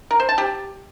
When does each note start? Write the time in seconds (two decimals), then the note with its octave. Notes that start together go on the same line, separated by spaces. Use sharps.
0.11 A#4
0.20 C5
0.29 A5
0.38 G4